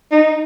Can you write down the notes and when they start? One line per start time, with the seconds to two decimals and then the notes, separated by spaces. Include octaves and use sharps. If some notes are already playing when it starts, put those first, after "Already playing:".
0.12 D#4